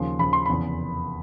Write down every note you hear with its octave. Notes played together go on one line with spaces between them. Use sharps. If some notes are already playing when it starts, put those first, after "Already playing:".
Already playing: D#2 C#3 F3 C6
D#2 C#3 F3 B5
C6
F1 E2 C#3 B5